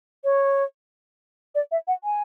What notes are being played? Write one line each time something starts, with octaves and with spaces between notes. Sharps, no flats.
C#5
D5
E5
F#5
G#5